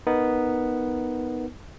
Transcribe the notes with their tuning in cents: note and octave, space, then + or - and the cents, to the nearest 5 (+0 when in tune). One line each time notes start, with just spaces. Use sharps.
B3 +0 D#4 +0 A#4 +0